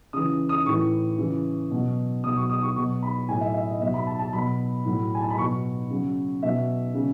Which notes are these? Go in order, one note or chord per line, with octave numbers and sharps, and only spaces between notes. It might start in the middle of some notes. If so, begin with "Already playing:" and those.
C#3 E3 D#6
D#6
A2 E3 C#6
C#3 E3
B2 F#3
B2 F#3 D#6
C#6
D#6
C#6
B2 F#3 C#6
B5
A2 F#3 G#5
E5
E5
D#5
B2 F#3 E5
B5
A5
A5
B2 F#3 B5
A2 F#3
G#5
A5
B5
B2 F#3 C#6
C#3 F#3
B2 F#3 E5
C#3